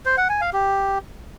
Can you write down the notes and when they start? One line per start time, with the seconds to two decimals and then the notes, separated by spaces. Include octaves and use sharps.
0.06 C5
0.17 F#5
0.29 G#5
0.41 F5
0.53 G4